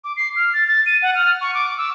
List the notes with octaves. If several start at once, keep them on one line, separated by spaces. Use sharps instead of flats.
D6
C7
F6
A6
A6
D#7
F#5
F6
C#6
D6
E6